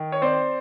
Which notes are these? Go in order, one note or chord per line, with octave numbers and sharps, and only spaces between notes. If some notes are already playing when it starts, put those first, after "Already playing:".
Already playing: D#3
C#5
C4 C5 D5